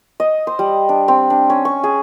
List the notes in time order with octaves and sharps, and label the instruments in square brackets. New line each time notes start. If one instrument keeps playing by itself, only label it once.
[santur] D#5
C5
G3
D4
C4
D4
C#4
C#6
G#4